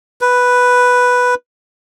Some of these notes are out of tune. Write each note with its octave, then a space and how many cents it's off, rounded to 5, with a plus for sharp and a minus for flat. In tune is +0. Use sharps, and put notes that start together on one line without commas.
B4 +0